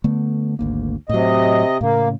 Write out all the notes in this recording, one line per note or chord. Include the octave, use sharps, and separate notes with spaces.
D3 A3 B3
G#1 D2 A#3
A2 C3 F#3 D#5
A2 C#3 A#3